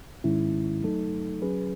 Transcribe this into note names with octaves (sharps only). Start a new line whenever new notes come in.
G#2 D#3 G#3 C#4 E4
F#3 A3 D#4 A4
F#3 C#4 G#4 B4